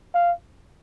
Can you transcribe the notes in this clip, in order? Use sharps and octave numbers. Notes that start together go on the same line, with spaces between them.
F5